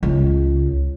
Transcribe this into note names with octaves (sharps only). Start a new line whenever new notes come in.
C#2